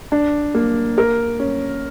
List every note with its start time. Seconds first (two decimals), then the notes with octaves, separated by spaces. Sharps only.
0.12 D4
0.55 A#3
0.98 A#4
1.40 C#4